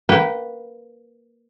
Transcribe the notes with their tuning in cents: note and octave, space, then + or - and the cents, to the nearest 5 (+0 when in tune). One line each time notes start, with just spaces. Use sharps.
A#3 +0 B4 +0 G5 -30